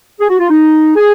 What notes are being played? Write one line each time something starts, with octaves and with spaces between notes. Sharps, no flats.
G#4
F#4
F4
D#4
G#4